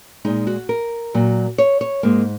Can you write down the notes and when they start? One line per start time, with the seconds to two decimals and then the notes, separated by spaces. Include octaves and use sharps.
0.25 A#2 G#3 D#4
0.47 F#4
0.69 A#4
1.14 A#2 F#3
1.58 C#5
1.81 C#5
2.03 G#2 G#3 A#3